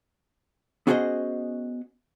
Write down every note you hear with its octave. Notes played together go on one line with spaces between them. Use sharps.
B3 C#4 F#4 G#4 C5 D#5